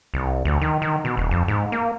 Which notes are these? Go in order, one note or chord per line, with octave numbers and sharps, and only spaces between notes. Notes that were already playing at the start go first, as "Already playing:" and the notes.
C2
D2
D#3
D#3
B2
D#1
F2
G#2
A#3